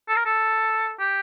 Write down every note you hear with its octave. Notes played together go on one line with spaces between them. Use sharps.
A4
A#4
A4
G4